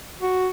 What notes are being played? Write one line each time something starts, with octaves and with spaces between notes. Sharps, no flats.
F#4